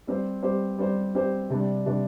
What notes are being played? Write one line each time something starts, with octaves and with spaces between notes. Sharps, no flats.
G3 C4 G4 C5
G3 C4 G4 C5
G3 C4 G4 C5
G3 C4 G4 C5
C3 G3 D4
C3 G3 D4